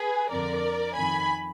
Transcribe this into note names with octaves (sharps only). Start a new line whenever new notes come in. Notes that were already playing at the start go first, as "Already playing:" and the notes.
Already playing: G#4 B4
F2 D3 A#4 D5
F2 D#3 G#5 B5